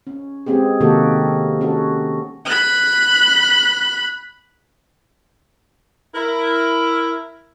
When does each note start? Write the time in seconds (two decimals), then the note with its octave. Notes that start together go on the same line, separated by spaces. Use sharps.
0.07 C#4
0.46 G#3 B3 C4 G4 G#4
0.81 C3 D#3 A#3 F#4 G4 A4
1.61 C#4 F#4 A4
2.46 B5 F#6
6.15 E4 A#4